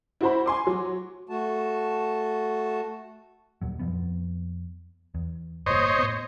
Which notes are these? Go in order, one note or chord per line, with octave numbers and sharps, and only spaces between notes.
E4 F#4 C5 B5
G#5 C6 D6
F#3
A3 F#4 A5
D#2 A#2 F#3
F2 F3 B3
E2
G1 A#2 C5 C#5 D#5
A2 B3